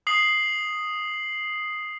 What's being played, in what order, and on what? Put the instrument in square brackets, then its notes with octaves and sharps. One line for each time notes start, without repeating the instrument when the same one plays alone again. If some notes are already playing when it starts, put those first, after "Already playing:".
[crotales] D#6 C7 F#7